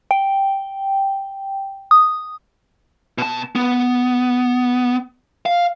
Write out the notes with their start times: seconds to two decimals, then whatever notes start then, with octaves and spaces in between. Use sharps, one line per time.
0.11 G5
1.91 D#6
3.18 B2 A5
3.55 B3
5.46 F5